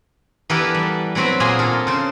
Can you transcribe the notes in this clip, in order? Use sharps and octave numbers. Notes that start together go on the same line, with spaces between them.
E3 B3 G4 A4 A#4 D5
G3
F#3 B3 C4 F#4 B4
A#2 A#3 G#4 G#5 C6
F4 A4 A#4
C#3 C5